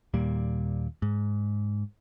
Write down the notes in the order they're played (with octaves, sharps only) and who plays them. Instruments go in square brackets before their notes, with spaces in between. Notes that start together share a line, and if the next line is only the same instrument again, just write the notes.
[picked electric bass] D#2 A#2 G3 A#3
G#2